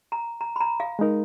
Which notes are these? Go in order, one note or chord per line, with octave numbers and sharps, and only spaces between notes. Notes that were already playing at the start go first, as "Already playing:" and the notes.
A#5
A#5
B5
A#5
F5
G#3 D#4 A#4